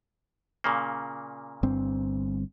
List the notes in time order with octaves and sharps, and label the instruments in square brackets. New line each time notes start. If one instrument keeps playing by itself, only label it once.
[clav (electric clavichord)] A#2 C#3 A#3
[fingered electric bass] G1 G2 C4